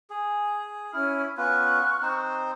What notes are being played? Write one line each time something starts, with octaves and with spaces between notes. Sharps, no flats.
G#4
C#4 E4 F6
B3 C#4 F4 C#6 F6 F#6
C4 D#4 C5